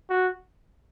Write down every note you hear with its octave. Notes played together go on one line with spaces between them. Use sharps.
F#4